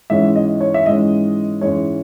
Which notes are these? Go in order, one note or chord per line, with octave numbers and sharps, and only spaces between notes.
G#2 E3 G#3 C#4 E5
D#5
C#5
E5
G#2 E3 G#3 C#4 D#5
G#2 E3 G#3 C#4 C#5